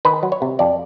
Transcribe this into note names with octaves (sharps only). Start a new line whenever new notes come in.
D#3 B4
F#3
C#5
C3
F2 D5